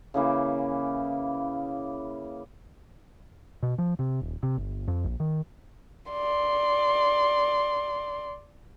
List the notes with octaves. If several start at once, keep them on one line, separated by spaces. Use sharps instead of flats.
C#3 E3 A#3
B2
F3
C3
D#1
C3
G1
F2
A#1
D#3
D5 C6